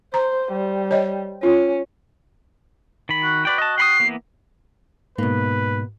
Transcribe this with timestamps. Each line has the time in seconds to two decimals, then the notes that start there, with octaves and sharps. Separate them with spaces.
0.14 C5 A#5
0.52 G3
0.91 C#5 D#5
1.43 C#4 F4
3.09 D#3 B5
3.23 F#4
3.45 F#4 B4 D5 G5
3.58 D#5 A5
3.78 G5 B5 D#6 C7
4.00 E3 A#3 B3
5.18 G#2 B2 A#3 B4